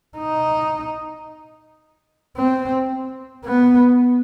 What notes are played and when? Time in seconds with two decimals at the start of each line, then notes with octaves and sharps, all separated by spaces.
0.17 D#4
2.37 C4
3.45 B3